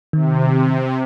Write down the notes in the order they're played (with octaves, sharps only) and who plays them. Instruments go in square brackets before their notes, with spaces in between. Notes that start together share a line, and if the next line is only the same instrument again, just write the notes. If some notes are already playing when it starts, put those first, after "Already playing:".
[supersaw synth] C3 [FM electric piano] D#3